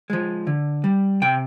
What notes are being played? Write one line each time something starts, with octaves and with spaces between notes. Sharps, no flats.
F3 G#3
D3
G3
C3 G5